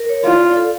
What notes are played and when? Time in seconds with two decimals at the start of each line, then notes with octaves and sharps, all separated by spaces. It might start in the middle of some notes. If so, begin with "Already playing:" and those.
Already playing: A#4
0.09 C#5
0.25 F4 D5
0.41 F5
0.57 A4